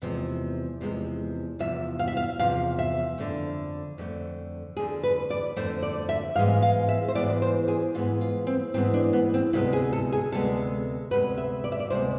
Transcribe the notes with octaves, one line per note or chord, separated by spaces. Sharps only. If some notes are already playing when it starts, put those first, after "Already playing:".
E2 C3 F3 G#3
E2 C3 F3 G#3
E2 C3 F3 E5
F5
E5
F5
E2 C3 F3 F5
E5
F2 D3 A3
F2 D3 A3
F2 D3 A3 G#4
B4
D5
F2 D3 A3 C5
D5
E5
G#2 E3 G#3 B3 F5
F5
E5
C5
G#2 E3 G#3 B3 D5
C5
G#4
G#2 E3 G#3 B3 F4
F4
C4
G#2 E3 G#3 B3 C4
D4
B3
C4
D2 C3 G#3 B3 E4
G#4
A4
G#4
D2 C3 G#3 B3 A4
D2 C3 G#3 B3 B4
E5
D5
E5
D5
D2 C3 G#3 B3 C5